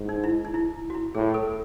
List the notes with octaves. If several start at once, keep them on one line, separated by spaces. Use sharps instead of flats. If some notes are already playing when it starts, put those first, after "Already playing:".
Already playing: G#2
D#4
E4
D#4
E4
F#4
E4
A2 G#4
A4